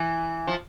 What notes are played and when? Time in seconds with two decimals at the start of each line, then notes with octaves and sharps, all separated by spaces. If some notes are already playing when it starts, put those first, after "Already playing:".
Already playing: E3
0.47 F3